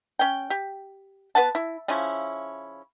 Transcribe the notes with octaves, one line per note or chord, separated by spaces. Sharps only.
C#4 G5
G4
B3 B4 F#5 A5
E4
C#3 F3 C#4 E4